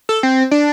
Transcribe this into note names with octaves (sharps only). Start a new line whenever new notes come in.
A4
C4
D4